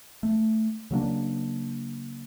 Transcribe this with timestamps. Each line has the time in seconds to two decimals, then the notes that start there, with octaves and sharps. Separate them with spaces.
0.23 A3
0.91 C#3 F#3 A#3 D4